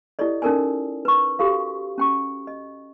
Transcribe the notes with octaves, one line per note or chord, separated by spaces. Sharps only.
E4 G4 A4 D5 D#5
C#4 D#4 A4 A#4 D5 G#5
B4 C#6
F#4 G4 A4 F5
C#4 G5 C#6
D#5